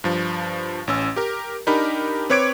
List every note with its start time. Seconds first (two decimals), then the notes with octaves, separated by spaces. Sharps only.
0.04 G2 F3
0.87 A1 C#4 E6
1.16 G4 A#4
1.67 D4 D#4 G4 A#4 B5
2.30 C4 B4 C#5 D6 G#6 D7